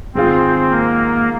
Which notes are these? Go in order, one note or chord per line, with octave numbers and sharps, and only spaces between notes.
G#2 D#3 G#3 C4 F4
A#3